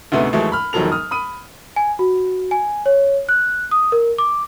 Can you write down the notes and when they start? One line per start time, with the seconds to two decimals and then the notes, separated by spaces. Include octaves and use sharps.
0.12 D2 G#2 C3 A3 B3
0.33 D#2 E3 F#3 G#3 A3
0.52 B5 F6
0.73 E1 D#3 F3 F#3 A4 F7
0.92 D#6 F6
1.11 B5 D#6 D#7
1.76 G#5
1.99 F#4
2.51 G#5
2.86 C#5
3.29 F#6
3.71 D#6
3.92 A#4
4.18 D6